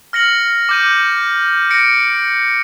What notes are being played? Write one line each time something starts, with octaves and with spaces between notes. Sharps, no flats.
F6 A#6 C#7 F#7
D6 G6 D#7
A#6 C#7 D7